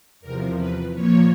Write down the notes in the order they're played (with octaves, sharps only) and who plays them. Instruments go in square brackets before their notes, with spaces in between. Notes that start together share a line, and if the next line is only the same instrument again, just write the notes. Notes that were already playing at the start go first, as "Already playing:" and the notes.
[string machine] E2 C3 F3 A#4
B4
A#2 F3 A#3 C#5